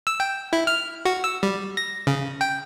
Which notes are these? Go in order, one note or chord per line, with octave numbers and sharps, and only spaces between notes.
E6
G5
E4
F6
F#4
E6
G3
A#6
C#3
G5